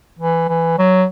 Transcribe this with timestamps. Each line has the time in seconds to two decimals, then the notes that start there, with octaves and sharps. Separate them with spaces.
0.19 E3
0.49 E3
0.78 F#3